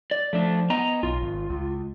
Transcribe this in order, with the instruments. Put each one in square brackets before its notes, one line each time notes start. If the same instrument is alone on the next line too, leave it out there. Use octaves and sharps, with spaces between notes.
[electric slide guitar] D5
[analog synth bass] F3 [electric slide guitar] A3 D4
[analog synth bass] B3 [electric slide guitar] D#5 G#5 A#5
[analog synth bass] B1 [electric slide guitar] F4
[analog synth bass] G#1
C#2